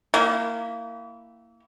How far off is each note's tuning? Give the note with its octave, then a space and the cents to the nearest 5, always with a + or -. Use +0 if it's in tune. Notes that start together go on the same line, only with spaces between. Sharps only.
A#3 -15 E4 +0 G4 -40